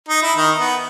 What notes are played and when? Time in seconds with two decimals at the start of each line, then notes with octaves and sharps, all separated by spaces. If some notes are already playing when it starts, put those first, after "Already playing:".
0.09 D#4
0.23 E4
0.36 D#3 D#4
0.58 B3